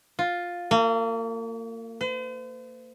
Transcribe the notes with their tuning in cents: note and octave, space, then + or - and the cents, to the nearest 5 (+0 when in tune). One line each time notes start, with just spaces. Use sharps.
F4 +10
A#3 -35
C5 -45